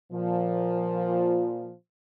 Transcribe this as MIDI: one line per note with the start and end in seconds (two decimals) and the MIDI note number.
0.13 1.74 46
0.13 1.74 53